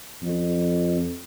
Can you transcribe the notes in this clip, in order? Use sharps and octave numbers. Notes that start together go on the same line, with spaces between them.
F2